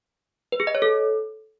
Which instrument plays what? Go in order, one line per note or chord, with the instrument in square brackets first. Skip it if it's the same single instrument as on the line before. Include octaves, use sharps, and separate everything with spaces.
[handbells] B4
G#4
D#5
C#5
A4